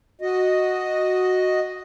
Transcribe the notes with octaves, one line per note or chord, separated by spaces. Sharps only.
F#4 D#5